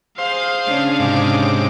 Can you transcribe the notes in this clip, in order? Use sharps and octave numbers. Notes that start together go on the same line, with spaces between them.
G#4 C5 F5
C#3 C#4 D4
G#2 C3 D6